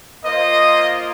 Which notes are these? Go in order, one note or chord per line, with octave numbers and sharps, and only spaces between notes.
A#3 F4 C5 D#5